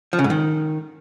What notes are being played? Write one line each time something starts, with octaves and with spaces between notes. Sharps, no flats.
F3
C#3
G#2
D#3